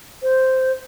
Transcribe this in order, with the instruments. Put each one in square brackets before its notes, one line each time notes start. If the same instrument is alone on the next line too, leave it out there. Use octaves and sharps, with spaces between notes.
[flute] C5